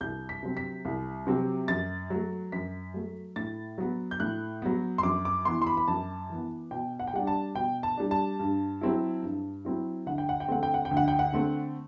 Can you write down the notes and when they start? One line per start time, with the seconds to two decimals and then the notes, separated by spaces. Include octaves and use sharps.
0.01 C2 G6
0.29 B6
0.43 C3 F#3 C4
0.57 B6
0.85 C2
1.27 C3 F#3 C4
1.68 F#2 A6
2.10 F#3 A3
2.52 F#2 B6
2.94 F#3 A3
3.36 A2 A6
3.78 F#3 B3
4.11 G6
4.20 A2 F#6
4.62 F#3 B3
4.98 C6
5.03 F#2 D6
5.25 D6
5.45 E3 B3 C6
5.62 C6
5.67 B5
5.77 B5
5.88 F#2 A5
6.30 E3 B3
6.71 B2 G5
6.99 F#5
7.07 G5
7.14 G3 D4 F#5
7.27 A5
7.55 B2 G5
7.83 A5
7.97 G3 D4
8.11 A5
8.40 G2
8.81 F#3 C4 E4
9.23 G2
9.65 F#3 C4 E4
10.06 D2 F#5
10.18 G5
10.29 F#5
10.40 G5
10.48 D3 A3 C4 F#5
10.63 G5
10.74 F#5
10.85 G5
10.91 D2
10.97 F#5
11.08 G5
11.19 F#5
11.33 D3 A3 C4